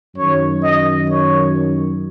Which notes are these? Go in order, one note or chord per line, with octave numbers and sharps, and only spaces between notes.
F#2 D#3 C#5
D#5
C#5